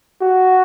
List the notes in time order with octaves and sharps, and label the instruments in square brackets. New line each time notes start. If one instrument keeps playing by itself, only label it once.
[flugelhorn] F#4